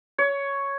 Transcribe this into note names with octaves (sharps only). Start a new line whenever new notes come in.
C#5